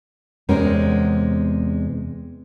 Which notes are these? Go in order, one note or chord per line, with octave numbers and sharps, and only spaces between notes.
E2 C3 G#3 C#4 A#4